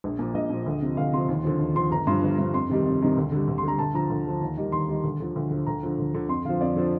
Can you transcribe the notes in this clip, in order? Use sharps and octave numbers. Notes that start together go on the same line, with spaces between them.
A#1
A#2 F3
A#1 D#5
A#2 F3
D2
C3 F3
D2 F5
C3 F3 C6
D#2
D3 F3
D#2
D3 F3 C6
G1 A#5
G2 F3 C6
G1
G2 F3
F2 C6
C3 D#3 G3
F2
C3 D#3 G3
D2
D3 G3
D2
C6
D3 G3 A#5
D2 A5
D3 F3 A#5
D2
D3 F3
D#2
D#3 G3
D#2 C6
D#3 G3
D2
D3 F3
D2
D3 F3
D2 A#5
D3 F3
D2
D3 F3
F2 C6
D3 F3 F5
F2 D5
D3 F3